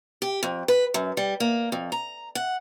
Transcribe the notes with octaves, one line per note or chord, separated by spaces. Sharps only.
G4
F2
B4
F#2
G3
A#3
F2
A#5
F#5